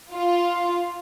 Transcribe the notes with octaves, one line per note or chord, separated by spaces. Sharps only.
F4